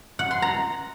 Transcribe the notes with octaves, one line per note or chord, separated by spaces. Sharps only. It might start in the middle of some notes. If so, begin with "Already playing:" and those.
F#5
C6
A#5